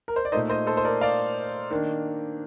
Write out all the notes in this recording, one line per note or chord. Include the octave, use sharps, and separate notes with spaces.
A#4
C5
D5
A#2 A3 D#4 C5 D#5
C5 D#5
A4 C5
C5
A#4 D5
D5 F5
D#3 A#3 D4